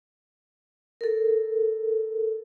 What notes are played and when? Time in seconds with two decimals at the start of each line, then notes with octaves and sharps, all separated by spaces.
1.01 A4 A#4